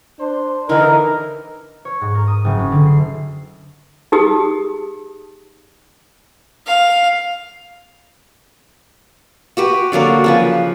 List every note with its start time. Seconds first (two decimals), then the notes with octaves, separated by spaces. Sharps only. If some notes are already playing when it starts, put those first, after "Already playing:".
0.19 D4 C5
0.69 D3 E3 D#4 E4 A#4 D#5
1.85 C#5
2.01 G#2
2.15 A#4
2.27 D#6
2.45 F#1
2.59 C#4
2.72 D3
2.86 C7
4.12 D#4 G4 G#4 D#6
6.66 F5
9.57 F#4 G4 B4
9.92 D3 F#3 A#3 D4
10.24 C#3 F3 B4